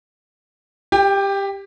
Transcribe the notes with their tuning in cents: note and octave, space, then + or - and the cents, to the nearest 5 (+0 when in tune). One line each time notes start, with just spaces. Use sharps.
G4 +10 G5 +45